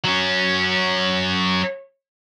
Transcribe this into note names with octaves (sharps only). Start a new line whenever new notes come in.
F#3 C#4